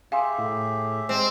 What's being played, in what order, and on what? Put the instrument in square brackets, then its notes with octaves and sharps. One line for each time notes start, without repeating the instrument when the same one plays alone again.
[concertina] G4 G#4 E5 [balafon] F5 G#5 C6
[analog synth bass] A2
[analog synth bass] G#3 [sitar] C4